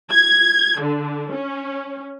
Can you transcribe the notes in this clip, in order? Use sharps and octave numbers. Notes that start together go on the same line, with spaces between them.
G#6
D3
C#4